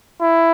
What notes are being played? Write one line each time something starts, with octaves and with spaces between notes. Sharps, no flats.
E4